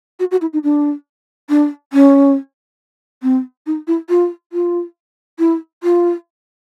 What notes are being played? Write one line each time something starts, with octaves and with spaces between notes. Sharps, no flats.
F#4
F#4
E4
D#4
D4
D4
C#4
C4
D#4
E4
F4
F4
E4
F4